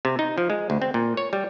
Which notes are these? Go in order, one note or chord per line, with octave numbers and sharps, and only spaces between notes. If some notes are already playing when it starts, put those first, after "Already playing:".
C3
D#4
F3
G#3
D2
C4
A#2
C#5
G3